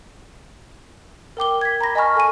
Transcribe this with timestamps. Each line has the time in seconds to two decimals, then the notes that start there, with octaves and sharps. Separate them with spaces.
1.37 A#4 G5 D6 G7
1.61 G#6 B6
1.81 A#5 B5 A#6
1.95 D#5 G#5 A5 B5 C#6 F6
2.16 A4 G#5 B5 D#7